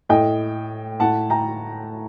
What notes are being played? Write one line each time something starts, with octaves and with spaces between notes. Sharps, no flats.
A2 D#5 G5
A2 F#5 A5
G5 A#5